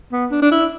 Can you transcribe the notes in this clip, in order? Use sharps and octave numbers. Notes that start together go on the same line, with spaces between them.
B3
D4
D4
E4